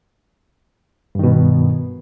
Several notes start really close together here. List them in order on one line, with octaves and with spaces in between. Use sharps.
G2 D#3 B2